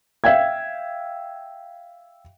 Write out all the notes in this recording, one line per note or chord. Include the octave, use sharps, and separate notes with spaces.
E5 F5 G5 G#6